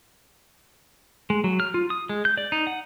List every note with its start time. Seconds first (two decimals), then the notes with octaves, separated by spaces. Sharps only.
1.30 G#3
1.44 F#3
1.60 F6
1.74 F4
1.90 D#6
2.09 G#3
2.25 G6
2.37 D5
2.52 D#4
2.67 F#5